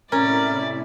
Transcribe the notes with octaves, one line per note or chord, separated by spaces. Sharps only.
A2 C3 C#4 E4 A#4 D5